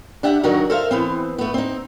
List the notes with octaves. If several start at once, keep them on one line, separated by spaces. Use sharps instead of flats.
D4 G4 E5 F#5
D3 D#3 F#3 D#4 F#4 A#4
A4 A#4 C5 E5 F5
E3 B3 C4
A3 B3
C4 D#4